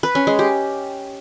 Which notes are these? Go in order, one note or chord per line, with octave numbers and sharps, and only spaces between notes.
B4
C#4
G#3
G4